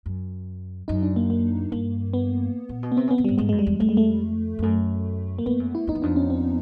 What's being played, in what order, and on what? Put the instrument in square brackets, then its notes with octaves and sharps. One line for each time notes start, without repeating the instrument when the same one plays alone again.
[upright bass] F#2
[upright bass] F#2 [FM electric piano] D#4
[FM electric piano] D4
A#3
A#3
[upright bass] G2 [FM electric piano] A#3
[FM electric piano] B3
[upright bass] A#2
B2
[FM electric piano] B3
[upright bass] C3 [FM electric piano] C4
[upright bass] C#3
[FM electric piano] B3
[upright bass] C#3
[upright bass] G#2 [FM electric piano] G3
[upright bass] G#2 [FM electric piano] G#3
[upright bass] F#2 [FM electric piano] G#3
[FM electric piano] G3
[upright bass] E2
[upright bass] F2 [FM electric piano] A3
[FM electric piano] G#3
A3
[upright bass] F2
[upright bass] F#2 [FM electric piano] A3
[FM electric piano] A#3
[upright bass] G2 [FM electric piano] B3
[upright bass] F#2
[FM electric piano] E4
[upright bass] F2 [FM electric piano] D#4
[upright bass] E2
[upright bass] F2 [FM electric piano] D4
[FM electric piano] C#4
C4